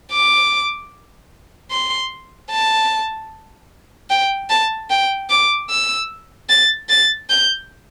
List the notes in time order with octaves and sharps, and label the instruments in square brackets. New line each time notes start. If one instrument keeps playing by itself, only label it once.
[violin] D6
C6
A5
G5
A5
G5
D6
E6
A6
A6
G6